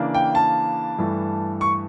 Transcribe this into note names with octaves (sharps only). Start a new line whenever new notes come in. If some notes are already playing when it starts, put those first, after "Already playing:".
Already playing: C#3 E3 A#3 D4
G5
A5
G2 E3 A3
C#6